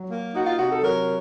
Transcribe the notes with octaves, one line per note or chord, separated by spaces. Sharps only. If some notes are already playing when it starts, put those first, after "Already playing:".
Already playing: F#3
A#3
D#4 F#4
F4
C3 F#4
A4
F#3 A#4